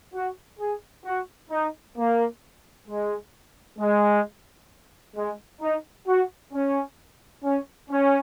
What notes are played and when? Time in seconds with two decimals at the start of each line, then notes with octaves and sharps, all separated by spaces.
0.14 F#4
0.59 G#4
1.05 F#4
1.51 D#4
1.97 A#3
2.87 G#3
3.79 G#3
5.15 G#3
5.61 D#4
6.07 F#4
6.53 C#4
7.44 C#4
7.90 C#4